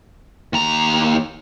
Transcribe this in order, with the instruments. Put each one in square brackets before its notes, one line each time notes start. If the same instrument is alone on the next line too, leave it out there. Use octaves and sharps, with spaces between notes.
[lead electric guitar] D#2 A#5